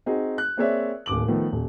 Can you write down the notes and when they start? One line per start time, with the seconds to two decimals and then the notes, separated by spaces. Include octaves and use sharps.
0.06 C4 D#4 F#4 G#4
0.38 F#6
0.57 A#3 C4 G#4 C#5 D5 E5
1.06 D1 D#2 D6 F#7
1.28 D#3 F3 A3 B3
1.52 D#1